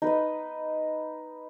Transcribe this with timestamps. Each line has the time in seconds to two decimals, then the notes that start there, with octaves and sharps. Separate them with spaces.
0.02 D#4 B4 D#5